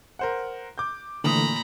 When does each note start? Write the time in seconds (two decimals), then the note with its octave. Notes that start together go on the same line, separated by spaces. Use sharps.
0.19 A#4 C5 F#5
0.78 D6 G6
1.24 A#2 D3 E3 A3 A#5 B5 D#6